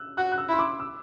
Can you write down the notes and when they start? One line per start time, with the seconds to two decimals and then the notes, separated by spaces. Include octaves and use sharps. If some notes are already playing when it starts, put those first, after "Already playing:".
Already playing: E6 F#6
0.17 F#4 F#6
0.32 F#6
0.38 E6
0.49 E4 C6
0.59 D6
0.80 E6